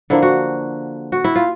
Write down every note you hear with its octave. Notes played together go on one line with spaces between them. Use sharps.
D3 F3 A#3 E4
F#4
F#4
E4
F4